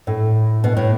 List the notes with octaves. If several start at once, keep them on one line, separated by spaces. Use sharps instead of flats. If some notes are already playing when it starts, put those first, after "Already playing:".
A2
B2
A2